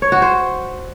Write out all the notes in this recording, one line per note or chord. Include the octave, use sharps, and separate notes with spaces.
C#5
F#4
C5